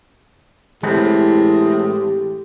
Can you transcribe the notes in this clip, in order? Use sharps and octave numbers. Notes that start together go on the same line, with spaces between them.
A2 E3 G#3 C4 G4